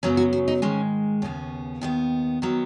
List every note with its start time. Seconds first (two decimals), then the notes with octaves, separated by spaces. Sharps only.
0.03 F#2 C#3 F#3 B3 C#4
0.17 F#4
0.33 F#4
0.48 D#4
0.62 G#2 D#3 G#3 C#4
1.22 D#2 C#3 B3 C#4
1.81 D#2 D#3 B3
2.42 D#3 F#3 B3